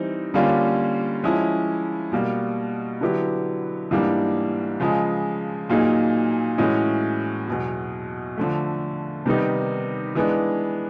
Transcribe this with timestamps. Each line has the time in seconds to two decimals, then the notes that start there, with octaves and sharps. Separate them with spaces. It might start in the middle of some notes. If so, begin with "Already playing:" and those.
Already playing: E3 G3 C4 D#4
0.34 D3 G3 A#3 C#4 F4
1.23 F3 G#3 C#4 E4
2.12 B2 G3 A#3
3.01 D3 F#3 B3 E4 G4
3.91 G#2 E3 G3 A#3 D4
4.80 C#3 F3 G#3
5.69 A#2 F#3 A#3 D#4 G#4
6.58 A2 E3 G#3 C#4 F#4
7.47 E2 B2 F#3
8.37 D3 F3 A3
9.26 C3 D#3 G3 B3 D#4
10.15 E3 G#3 B3 D4